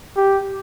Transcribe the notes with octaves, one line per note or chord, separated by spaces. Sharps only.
G4